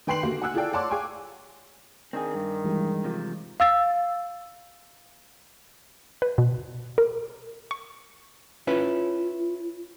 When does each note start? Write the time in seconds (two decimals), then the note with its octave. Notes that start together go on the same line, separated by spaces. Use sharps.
0.07 D#3 B4 G5 C6 C7 F#7
0.23 D3 A#3 F#4 G4
0.42 F#5 G#5 E6 F#6
0.54 E4 F4 G#4 A4 D5 G5
0.73 C#5 D5 F#5 A5 C6 D6
0.90 G#4 F5 G5 G#5 C#6
2.13 D#3 C4 D4 G#4
2.35 G2
2.65 E3 G3 G#3
3.04 C3 F3
3.60 F5 E6 A6
6.22 B4
6.38 B2
6.98 A#4
7.71 C#6
8.67 C#4 E4 F4 B4